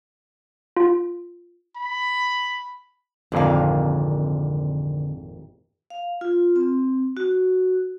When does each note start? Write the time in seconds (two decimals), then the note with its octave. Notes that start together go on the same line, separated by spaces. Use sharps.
0.77 F4
1.76 B5
3.32 G#1 F2 A#2 D3 F5
5.90 F5
6.21 F4
6.56 C4
7.17 F#4